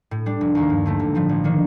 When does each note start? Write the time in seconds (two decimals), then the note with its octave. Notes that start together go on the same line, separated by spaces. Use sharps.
0.11 A2
0.26 G3 D4
0.41 F1
0.55 D#2 D#3 A#3
0.70 G2
0.86 D3 A3 C4
0.99 A1
1.15 A2 F3 A3
1.29 A1
1.44 D#3 A#3 D4